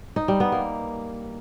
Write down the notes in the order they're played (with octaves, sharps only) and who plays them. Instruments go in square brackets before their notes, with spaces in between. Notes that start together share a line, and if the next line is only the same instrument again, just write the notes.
[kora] D#4
G3
B3
A#3